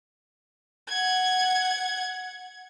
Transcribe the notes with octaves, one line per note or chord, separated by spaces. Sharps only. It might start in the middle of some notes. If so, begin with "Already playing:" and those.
F#5 G#6